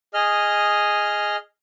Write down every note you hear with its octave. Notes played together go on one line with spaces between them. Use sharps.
G#4 D#5 F6